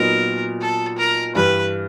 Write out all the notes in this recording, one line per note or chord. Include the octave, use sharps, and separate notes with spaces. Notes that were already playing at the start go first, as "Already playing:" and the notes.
Already playing: A#2 F#3 B3 D#4 A#4
A4
A#4
G2 E3 G3 B4